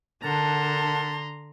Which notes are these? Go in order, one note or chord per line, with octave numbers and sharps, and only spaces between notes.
D3 A#4 F#5 A5 A#5 C6